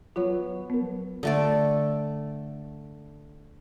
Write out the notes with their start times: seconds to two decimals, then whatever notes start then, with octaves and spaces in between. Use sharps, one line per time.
0.16 F#3 B3 F4 C#5
0.70 B3 A#4
1.23 D3 A3 D5